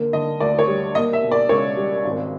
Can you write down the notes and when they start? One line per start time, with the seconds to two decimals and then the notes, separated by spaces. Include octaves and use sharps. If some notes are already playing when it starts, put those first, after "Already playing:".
Already playing: D3 A#3
0.13 D3 D#5
0.40 D2 D5
0.59 C#5
0.68 G3
0.95 A#3 D#5
1.13 E5
1.23 B2
1.32 D5
1.49 C#2 C#5
1.77 G3
2.05 G#1